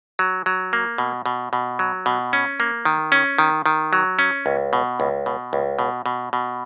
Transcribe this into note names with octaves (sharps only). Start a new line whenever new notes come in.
F#3
F#3
A#3
B2
B2
B2
F#3
B2
C#4
A#3
D#3
C#4
D#3
D#3
F#3
C#4
C#2
B2
C#2
B2
C#2
B2
B2
B2